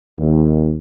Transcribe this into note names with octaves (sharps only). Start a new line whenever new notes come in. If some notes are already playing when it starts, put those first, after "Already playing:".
D#2